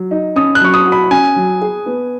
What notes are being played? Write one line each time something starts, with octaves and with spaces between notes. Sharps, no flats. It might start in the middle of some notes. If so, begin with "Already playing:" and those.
Already playing: F#3
D#4
C#4 D#6
F#6
F#3 C#6
D#6
F#4
B5
C#4 G#5
F#3
G#4
B3